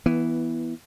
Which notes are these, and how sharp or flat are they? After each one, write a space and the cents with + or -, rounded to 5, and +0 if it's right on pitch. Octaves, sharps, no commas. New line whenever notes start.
E3 +0 B3 -15